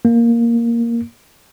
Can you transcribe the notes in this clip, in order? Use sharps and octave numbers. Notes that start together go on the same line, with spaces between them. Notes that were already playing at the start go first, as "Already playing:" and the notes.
A#3